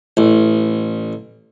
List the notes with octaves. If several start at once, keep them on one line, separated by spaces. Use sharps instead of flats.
A1